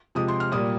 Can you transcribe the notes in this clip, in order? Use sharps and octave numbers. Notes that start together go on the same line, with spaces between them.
C3 F3 G#3 D#6
C6
F6
A#2 G3 A#3 D#6